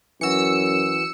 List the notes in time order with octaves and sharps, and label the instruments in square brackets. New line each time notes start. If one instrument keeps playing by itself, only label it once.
[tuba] F#2 [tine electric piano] E3 F#4 [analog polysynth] E6 C#7